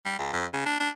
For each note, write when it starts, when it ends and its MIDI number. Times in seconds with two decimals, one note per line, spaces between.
0.05 0.18 55
0.18 0.31 37
0.33 0.45 41
0.53 0.64 49
0.66 0.77 62
0.80 0.90 62